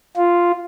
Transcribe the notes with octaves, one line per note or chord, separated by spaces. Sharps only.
F4